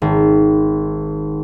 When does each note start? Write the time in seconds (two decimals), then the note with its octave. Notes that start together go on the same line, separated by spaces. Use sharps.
0.02 G#1